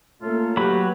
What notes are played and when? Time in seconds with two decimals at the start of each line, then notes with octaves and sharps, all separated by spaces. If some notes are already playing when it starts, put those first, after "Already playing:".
0.22 A3 A#3 C#4 F4 A4
0.57 F#3 G4 B4 B5